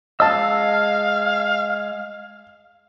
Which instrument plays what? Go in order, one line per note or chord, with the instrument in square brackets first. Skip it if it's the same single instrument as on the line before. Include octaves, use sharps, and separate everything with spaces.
[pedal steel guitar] G#3 E6 [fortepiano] D#5 A5 [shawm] F5